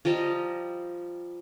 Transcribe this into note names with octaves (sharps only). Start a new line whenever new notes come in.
F3 G3 D#5 A#5